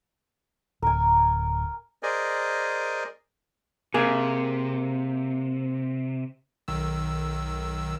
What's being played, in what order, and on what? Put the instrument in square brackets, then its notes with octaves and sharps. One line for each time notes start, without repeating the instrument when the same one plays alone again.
[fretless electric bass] D1 [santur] A#4 G#5
[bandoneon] G#4 A#4 C5 D5 D#5 G#5
[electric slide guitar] C3 [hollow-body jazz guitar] A#3 G#4
[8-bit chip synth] B1 D#3 E6